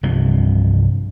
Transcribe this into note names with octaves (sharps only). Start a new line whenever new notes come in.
C2 G2 C3 F3